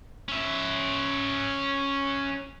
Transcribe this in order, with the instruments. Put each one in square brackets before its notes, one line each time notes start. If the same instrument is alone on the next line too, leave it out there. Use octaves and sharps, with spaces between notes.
[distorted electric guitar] C#4 E5